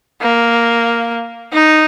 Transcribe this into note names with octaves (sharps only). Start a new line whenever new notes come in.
A#3
D#4